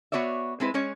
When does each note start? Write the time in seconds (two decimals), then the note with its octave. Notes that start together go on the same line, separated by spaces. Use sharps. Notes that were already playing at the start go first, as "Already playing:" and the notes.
0.12 B3 F#4 C#5 D5 E5
0.60 G#3 C4 E4 B4
0.74 G#3 C#4 C#5